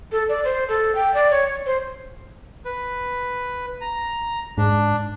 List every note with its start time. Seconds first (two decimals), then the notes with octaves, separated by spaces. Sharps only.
0.12 A4
0.29 D5
0.45 C5
0.69 A4
0.95 G5
1.14 D5
1.31 C#5
1.66 C5
2.65 B4
3.81 A#5
4.58 G#2 D4